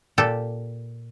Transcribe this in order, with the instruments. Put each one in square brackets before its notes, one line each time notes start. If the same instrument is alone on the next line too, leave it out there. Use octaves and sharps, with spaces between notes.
[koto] A#2 G4 A4